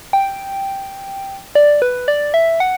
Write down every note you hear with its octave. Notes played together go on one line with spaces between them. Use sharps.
G5
D5
B4
D5
E5
F#5